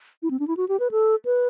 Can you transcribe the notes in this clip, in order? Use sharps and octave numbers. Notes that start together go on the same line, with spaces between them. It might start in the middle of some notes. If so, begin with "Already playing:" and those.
E4
C4
D4
E4
F#4
G4
B4
A4
B4